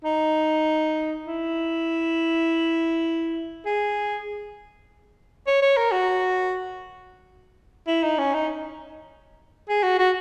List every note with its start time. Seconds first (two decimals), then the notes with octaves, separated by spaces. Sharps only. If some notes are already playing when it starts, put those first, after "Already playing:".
0.05 D#4
1.25 E4
3.66 G#4
5.47 C#5
5.62 C#5
5.77 A#4
5.92 F#4
7.87 E4
8.03 D#4
8.18 C#4
8.34 D#4
9.69 G#4
9.83 F#4
9.99 F#4